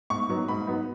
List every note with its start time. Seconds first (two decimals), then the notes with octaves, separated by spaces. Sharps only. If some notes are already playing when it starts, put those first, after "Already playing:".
0.10 G#2 C#6
0.30 F#3 B3 D#4
0.48 G#2 B5
0.67 F#3 B3 D#4